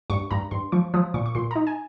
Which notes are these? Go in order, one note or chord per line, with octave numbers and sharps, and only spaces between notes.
G2 C#6
G2 A#5
G2 C6
F3 C#6
F3 D#6
A#2 C#6
C#6
A#2 C6
A#5
D#4
G#5